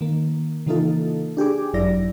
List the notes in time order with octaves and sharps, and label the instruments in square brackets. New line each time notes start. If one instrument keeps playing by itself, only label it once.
[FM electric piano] D#3 A#3
C#3 E3 A#3 D#4 F4 A4
D4 G4 G#4 D6
G#1 F#2 F#3 E4 D5 A#6